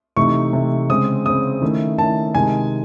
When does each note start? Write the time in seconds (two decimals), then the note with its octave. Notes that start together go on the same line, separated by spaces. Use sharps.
0.17 C3 E3 A3 D#4 C#6
0.53 C3 E3 A3 D#4
0.90 C#3 G#3 C4 D#6
1.26 C#3 G#3 C4 D#6
1.62 D#3 A3 C#4 E4
1.98 D#3 A3 C#4 E4 A5
2.35 C3 D#3 G#3 D#4 G#5